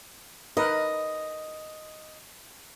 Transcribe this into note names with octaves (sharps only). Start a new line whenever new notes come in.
D#4 A#4 B4 D#5